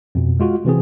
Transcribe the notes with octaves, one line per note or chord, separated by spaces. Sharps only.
F2 B2
G#3 F4 F#4
C3 E3 C4 G#4